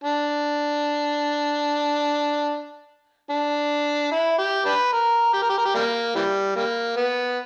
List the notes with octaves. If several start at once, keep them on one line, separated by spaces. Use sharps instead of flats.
D4
D4
E4
G4
D4 G4 B4
A#4
G4
A#4
G4
A#4
G4
G3 A#3
E3 G3
G3 A#3
B3